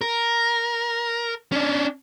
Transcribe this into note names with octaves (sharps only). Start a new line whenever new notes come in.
A#4
C#4 D4